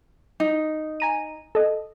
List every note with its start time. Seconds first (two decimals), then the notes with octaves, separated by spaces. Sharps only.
0.40 D#4
1.00 G#5 A#5 D#7
1.55 A4 D#5